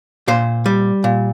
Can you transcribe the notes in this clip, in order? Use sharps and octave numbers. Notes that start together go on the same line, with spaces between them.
A#2 C5
G3
A#2